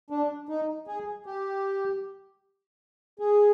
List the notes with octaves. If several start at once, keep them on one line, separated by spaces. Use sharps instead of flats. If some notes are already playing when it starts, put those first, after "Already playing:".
D4
D#4
G#4
G4
G#4